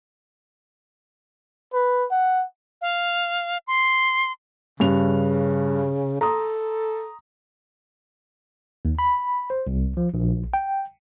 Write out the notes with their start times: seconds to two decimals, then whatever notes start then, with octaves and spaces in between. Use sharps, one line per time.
1.73 B4
2.11 F#5
2.81 F5
3.67 C6
4.80 G2 C#3 C#4 F7
6.21 A4 A#5 C6 D#6
8.85 D#2
8.99 B5
9.50 C5
9.67 C2
9.97 F3
10.14 A#1
10.54 G5